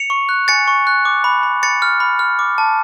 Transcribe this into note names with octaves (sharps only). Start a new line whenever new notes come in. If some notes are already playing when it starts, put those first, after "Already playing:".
Already playing: C#7 F7
C#6
F#6
G#5 A6 C#7
C#6
F#6
D6
B5
B5
B5 A6 C#7
F6
B5
F6
D6
A5